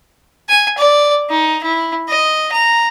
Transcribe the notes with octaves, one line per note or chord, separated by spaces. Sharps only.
G#5
D5
D#4
E4
D#5
A#5